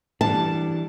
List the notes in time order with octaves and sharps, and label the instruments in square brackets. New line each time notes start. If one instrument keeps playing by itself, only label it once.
[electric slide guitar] E3 G3 D4 [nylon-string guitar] A5